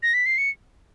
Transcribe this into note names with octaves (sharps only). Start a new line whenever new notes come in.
A#6
B6
C7
C#7